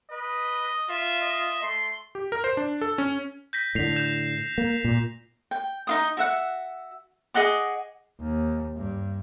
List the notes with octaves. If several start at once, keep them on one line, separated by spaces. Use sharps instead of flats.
B4 D#5
F4 E5
D#5
A3 C6
G4
A#4
C5
D4
A4
C#4
G6 A#6 B6
A2 D3 B6 C7 F7
G6 E7
A#3
A#2
G5
D#4 F4 D#6
F#4 E5 F#5
G#4 D#5 F#5 D6
D#2
G2